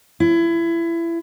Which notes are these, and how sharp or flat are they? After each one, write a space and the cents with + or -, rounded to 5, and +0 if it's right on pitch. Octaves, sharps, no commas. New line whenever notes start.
E4 +25